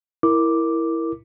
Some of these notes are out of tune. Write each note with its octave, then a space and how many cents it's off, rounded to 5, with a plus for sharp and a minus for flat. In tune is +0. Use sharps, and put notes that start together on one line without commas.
E4 +0 A#4 +0 D6 +0